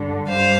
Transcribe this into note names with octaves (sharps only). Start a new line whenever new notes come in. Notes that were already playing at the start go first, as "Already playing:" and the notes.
Already playing: G2 D3
G2 G3 C5 F5